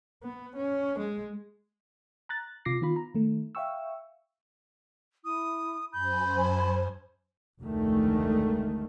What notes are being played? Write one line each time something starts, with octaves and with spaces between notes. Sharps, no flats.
B3
C#4
G#3
A#5 F#6 A6
C3 F4 D6 A#6 C7
D#3 B3 F4 B5
A#5
D#3 A3
E5 F5 G5 C#6 E6
E4 D#6
F#2 C5 G#5 B5 G6
A5
F1 D2 D3 D#3 G#3 A3